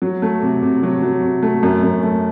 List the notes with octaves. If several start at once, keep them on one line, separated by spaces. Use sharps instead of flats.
F#3
A3
C3
C3
F#3
F#3
C3
A3
F#2
F#2
A3